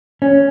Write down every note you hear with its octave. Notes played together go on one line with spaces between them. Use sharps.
C#4